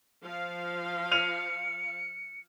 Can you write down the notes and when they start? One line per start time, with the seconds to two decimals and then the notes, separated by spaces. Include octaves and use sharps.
0.23 F3 F5
1.12 F6 C#7 D#7 F7